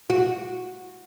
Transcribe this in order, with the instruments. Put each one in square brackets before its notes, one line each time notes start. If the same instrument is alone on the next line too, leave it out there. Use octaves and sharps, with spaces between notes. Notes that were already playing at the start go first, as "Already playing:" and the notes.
[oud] F#4